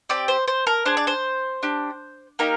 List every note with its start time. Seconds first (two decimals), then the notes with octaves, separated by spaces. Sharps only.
0.09 C4 G4 D5
0.28 C5
0.48 C5
0.67 A#4
0.85 D4 G#4 C5
0.97 D5
1.07 C5
1.63 D4 G4
2.39 A#3 D#4 G4 A#4